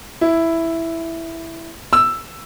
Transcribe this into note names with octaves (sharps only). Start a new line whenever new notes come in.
E4
E6